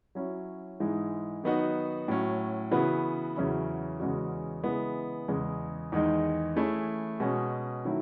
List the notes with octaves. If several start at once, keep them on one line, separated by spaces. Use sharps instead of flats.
F#3 C#4 E4
G#2 E3 G#3
D#3 F#3 B3 D#4 F#4
A2 F#3 C#4
C#3 E3 B3 F#4 B4
E2 C#3 F#3 C#4 E4
E2 C#3 G#3 C#4 F#4
C#3 E3 G#3 B3
E2 C#3 G#3
E2 D#3 G#3 D#4
E3 A3 C#4 E4 G#4
B2 G#3 C#4
D#3 F#3 A3 E4